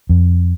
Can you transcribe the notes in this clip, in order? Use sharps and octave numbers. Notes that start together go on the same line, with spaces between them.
F2